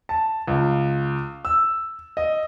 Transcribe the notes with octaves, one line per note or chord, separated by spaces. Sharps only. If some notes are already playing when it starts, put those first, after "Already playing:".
A5
C#2
E6
D#5